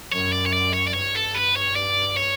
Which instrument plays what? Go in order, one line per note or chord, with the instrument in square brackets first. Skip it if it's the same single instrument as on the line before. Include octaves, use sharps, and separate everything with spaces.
[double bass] F#2 [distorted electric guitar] C#5
[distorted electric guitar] D5
C#5
D5
C#5
D5
[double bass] G2 [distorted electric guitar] C#5
[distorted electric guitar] A4
B4
C#5
D5
C#5